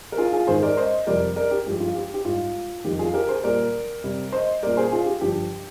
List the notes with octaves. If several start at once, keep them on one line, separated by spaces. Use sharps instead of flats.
A#4
F4 G#4
F4 G#4
G#2 D#3 G#3 G#4 C5
A#4 D5
C5 D#5
F2 C3 G3 A#4 D5
A#4 D5
G4
G2 F3 G#3 G4
F4
G4
G4
G#2 G3 F4
F2 D#3 G3 G4
F4 G#4
G4 A#4
G#4 C5
A#2 G3 A#4 D5
C3 G3
C5 D#5
A#2 G3 A#4 D5
G#4 C5
F4 G#4
G4
G2 D3 F3 G4